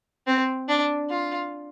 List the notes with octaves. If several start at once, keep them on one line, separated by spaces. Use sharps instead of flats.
C4
D4
F4